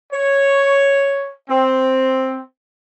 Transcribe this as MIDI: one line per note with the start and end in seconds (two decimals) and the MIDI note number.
0.12 1.30 73
1.49 2.40 60